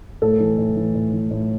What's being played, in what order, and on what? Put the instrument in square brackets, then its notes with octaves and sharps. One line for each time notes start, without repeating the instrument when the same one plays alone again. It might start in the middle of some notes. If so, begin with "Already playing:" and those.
[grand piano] A2 A4
E3
A2
E3
A2
E3
A2